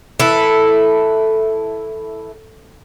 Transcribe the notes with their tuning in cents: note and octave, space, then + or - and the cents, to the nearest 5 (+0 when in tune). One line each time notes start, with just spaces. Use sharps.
E3 -10 E4 +0 A4 +0